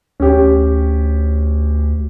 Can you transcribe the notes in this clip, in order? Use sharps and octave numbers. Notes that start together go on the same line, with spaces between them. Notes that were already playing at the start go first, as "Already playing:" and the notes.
D2 C#4 G4